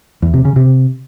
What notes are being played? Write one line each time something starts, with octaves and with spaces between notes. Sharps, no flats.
E2
C3
C#3
C3